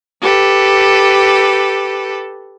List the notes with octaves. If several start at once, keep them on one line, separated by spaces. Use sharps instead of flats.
G4 A4 B4